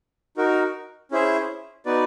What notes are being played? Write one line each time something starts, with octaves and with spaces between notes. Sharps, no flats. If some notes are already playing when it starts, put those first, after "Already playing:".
D#4 F#4 A#4
C#4 E4 G#4 C5 E5
B3 D#4 F#4 B4 D5